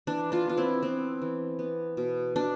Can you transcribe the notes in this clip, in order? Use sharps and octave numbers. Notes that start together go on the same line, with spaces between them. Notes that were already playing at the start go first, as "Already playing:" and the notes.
E3 D4
D4 F4
B3 F4
C4 E4
B3 C4
E3
B3
B2
B2 D4